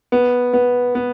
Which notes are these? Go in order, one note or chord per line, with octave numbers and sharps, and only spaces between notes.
B3
B3
B3